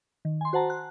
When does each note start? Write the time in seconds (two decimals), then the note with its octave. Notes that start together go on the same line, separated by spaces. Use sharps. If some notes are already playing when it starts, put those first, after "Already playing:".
0.25 D#3
0.41 G#5 C6
0.53 F#4 C5 F#5 A5 A#5
0.70 F#6